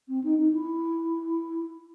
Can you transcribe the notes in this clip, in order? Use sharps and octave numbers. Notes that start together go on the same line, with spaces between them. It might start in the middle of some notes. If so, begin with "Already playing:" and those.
C4
D#4
D#4
E4